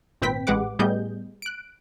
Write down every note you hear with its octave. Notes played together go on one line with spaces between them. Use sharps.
G#1 A#2 C4 B4 G5 B6
A1 G#3 G4 B4 F#5 D6
A2 G3 B3 G#4 D#5 G6
F#6 D7